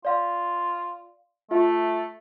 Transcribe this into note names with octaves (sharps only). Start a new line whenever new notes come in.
F4 D5 F5 C6
A3 F4 E5